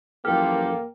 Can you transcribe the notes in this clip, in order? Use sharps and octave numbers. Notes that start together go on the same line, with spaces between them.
F#2 E3 F3 A#3 G4 A4 G5 F6